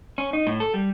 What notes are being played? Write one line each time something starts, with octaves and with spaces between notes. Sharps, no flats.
C#4
D#4
A2
A4
G3